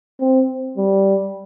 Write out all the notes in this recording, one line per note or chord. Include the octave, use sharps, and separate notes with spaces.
C4
G3